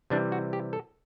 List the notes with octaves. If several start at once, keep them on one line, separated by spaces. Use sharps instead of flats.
C3 E3 G3 D4
F#4
G4
A4